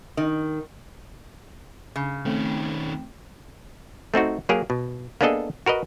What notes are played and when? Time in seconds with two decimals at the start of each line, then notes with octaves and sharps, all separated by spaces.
0.17 D#3
1.96 C#3
2.25 D#3 A3 C4 C#4 G5
4.14 A3 C4 D#4 F#4
4.49 F#3 A#3 G4 G#4 A#4
4.70 B2
5.21 A#3 B3 D4 G#4 A4 D#5
5.66 F#4 A#4 B4 D#5